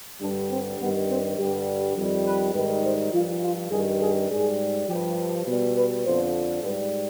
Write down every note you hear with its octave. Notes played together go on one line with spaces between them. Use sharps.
G2 D3 G3 D4
C4
G2 D#3 G3 B3
C4
G2 D3 G3 G4
F2 D#3 G3
B4
G#2 D#3 G3 B4
C5
G2 F3 F4
F4
G2 D#3 G3 G#4
G#4
G#2 G3 G#4
G2 F3 G4
B2 G3
B4
F2 D3 F3 C5
G#2 G3 B4